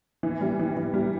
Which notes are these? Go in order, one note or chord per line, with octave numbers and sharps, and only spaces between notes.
E3
G3
E3
E3
G3